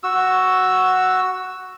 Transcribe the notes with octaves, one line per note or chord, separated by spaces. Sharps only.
F#4 E6